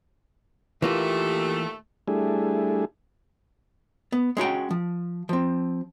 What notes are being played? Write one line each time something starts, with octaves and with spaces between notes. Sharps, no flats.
D#2 A#2 E3 A3 A#3 F4 G4
G3 A3 D4 E4 G#4
B3
G#3 C#4 F#4 G5
F3
F3 C4